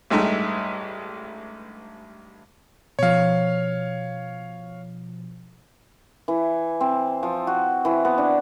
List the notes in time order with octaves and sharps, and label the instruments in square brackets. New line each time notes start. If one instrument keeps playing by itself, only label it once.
[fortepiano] A1 G2 G#3 A3 D#4 E5
[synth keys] B2 F3 [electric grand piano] C#5 F5
[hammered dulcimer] E3
C4
F3
F#4
E3
B3
D4